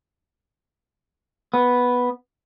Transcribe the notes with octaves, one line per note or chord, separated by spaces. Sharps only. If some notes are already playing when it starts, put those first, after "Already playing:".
B3